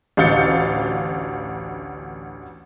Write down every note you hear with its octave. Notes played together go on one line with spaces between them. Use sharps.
A1 D2 F5 G6 A6 C#7